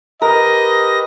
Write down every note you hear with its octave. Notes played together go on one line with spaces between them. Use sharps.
G4 A#4 B4 D#5 A#6